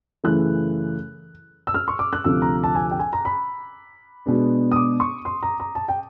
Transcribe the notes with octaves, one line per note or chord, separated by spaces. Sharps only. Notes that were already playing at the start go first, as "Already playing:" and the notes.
F#2 C#3 E3 A3 F#6
E6
F6
C#6
D6
F#6
D2 C3 F3 E6
A#5
A5
G#5
G5
G#5
A#5
B5
B2 G#3 B3 D4
D#6
D6
C#6
C6
A#5
A#5
A5
G5